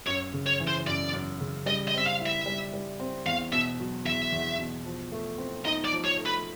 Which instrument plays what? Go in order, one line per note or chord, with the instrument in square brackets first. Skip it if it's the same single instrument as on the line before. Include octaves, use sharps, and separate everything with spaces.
[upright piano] F#2 [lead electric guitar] C#5
[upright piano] C#3
[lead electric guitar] C#5
[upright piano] E3
[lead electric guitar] C5
[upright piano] F#2 [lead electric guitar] D5
[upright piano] F#2
C#3
[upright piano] G3 [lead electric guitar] D#5
[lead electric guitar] D#5
[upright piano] C4 [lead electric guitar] E5
[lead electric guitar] F5
[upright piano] E4
[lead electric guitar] E5
[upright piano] G3
G3
C4
[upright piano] E2 [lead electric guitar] F5
[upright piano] B2 [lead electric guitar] E5
[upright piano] F#3
[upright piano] E2 [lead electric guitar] E5
[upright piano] E2
B2
F3
A3
C4
[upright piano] D#4 [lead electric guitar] D#5
[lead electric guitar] D5
[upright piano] F3
[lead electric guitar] C#5
[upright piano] A3
[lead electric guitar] B4